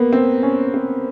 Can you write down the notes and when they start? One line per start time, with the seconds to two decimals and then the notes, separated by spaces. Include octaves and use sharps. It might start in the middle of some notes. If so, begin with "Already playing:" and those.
Already playing: A#3 B3
0.13 C4
0.43 C#4
0.74 C4